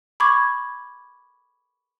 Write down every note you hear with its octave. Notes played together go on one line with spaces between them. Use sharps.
B5 C#6 D6 G#6